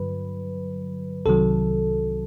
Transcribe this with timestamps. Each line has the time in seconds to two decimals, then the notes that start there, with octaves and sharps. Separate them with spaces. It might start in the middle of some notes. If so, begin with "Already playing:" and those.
Already playing: G2 D3 F#3 B4
1.26 C2 C3 D#3 F#3 A4